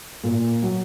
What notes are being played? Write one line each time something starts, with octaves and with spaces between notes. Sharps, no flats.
A#2
F#3